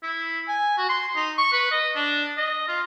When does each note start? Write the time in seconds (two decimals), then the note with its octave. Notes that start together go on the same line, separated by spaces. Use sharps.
0.03 E4
0.48 G#5
0.78 F#4
0.89 C6
1.16 D#4
1.38 C#6
1.53 B4
1.71 D#5
1.96 D4
2.37 D#5
2.68 F4